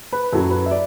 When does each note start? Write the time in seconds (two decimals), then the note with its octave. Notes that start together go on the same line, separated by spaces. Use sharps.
0.13 B4
0.32 F#2 F#3 A4
0.51 B4
0.66 E5
0.71 D5